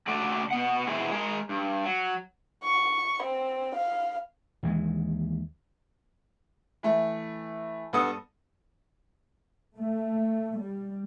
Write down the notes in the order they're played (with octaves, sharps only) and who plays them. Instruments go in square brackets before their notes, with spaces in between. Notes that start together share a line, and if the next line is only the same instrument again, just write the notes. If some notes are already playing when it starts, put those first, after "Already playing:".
[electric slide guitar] C#3 A3 F#4 A4 D5
B2 B3 F#5
B2 E3 C4 E4 G#4
G#3 G#4 A#4
G2
F#3
[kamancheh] C#6
C4
F5
[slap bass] D#2 E3 G#3
[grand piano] E3 A3
G2 B3 A4 D#6
[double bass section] A3
G3